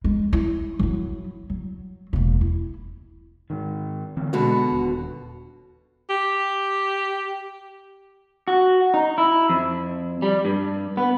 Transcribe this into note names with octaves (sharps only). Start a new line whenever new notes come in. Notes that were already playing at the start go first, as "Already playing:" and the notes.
G#3 D#4
E4
F#3 E4
F#3
E1 A#3
E4
G#2 D#3
D3 E3 C4
B2 D3 G#3 F#4
D#1
G4
F#4
D#4
E4
F2
G3
G2
B3